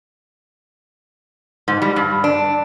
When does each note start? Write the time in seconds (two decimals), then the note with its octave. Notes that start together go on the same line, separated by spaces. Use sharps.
1.68 G#2
1.82 G3
1.96 G2
2.24 D4